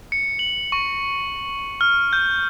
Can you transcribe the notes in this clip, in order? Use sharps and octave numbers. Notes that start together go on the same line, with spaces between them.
C#7
F#7
C#6
F6
G6